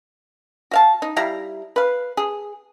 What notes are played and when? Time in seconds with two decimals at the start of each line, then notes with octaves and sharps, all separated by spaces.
0.71 F#4 F5 A5
1.02 D#4
1.16 G3 E4 F5 A#5
1.76 B4 F5
2.17 G#4